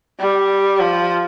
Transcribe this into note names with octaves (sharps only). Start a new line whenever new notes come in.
G3
F3